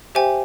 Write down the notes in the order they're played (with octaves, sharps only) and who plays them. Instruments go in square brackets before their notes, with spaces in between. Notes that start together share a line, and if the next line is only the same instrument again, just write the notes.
[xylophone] G4 C5 E5 G5 G#5